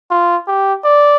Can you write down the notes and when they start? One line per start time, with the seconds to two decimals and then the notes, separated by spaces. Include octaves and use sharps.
0.11 F4
0.48 G4
0.84 D5